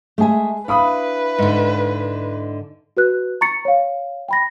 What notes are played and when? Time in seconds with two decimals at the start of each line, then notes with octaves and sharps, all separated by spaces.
0.18 G#3 A3 G#4 E5 G#5
0.68 D4 E4 B4 F5 B5 D#6
1.38 G#2 D3
2.97 F#4 B4 F#6
3.41 A#5 C#6 A6 C#7
3.65 C#5 F5
4.29 G5 B5 A#6